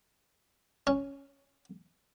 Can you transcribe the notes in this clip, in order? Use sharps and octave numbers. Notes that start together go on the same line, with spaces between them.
C#4